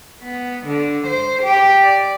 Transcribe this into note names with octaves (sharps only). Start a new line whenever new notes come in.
B3
D3
C5
G4
D5